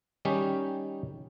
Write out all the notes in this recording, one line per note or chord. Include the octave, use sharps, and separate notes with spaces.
D#3 G3 C#4 D#4 G4